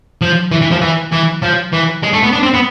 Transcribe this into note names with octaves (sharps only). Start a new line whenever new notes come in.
F3
E3
E3
F3
E3
E3
F3
E3
G#3
A3
B3
D4
C4
B3